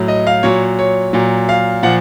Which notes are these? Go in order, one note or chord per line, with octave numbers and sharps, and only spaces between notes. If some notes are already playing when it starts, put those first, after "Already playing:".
Already playing: A2 F#3
D#5
F5
A#2 F#3 C#5
C#5
A#2 F#3
F5
A#2 F3 F#5